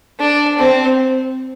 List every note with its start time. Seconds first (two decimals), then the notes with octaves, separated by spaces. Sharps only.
0.19 D4
0.59 C4